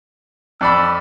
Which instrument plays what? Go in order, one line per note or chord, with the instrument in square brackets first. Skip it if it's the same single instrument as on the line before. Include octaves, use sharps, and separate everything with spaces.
[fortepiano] F2 D5 B5 [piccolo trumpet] E6